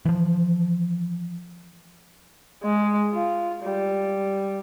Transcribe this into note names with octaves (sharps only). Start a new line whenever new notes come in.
E3 F3
G#3
F4
G3